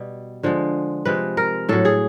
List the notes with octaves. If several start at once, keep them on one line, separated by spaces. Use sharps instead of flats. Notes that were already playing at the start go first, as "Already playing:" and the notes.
Already playing: B2 G3
D3 F3 G#3
C3 F3 G#3 B4
A#4
A2 F#3 A4
G#4